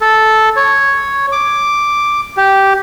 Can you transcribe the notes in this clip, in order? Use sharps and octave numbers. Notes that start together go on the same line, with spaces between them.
A4
C#5
D6
G4